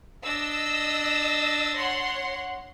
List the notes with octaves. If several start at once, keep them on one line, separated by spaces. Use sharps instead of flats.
D4 D#5 E6 A#6
C#5 F#5 C6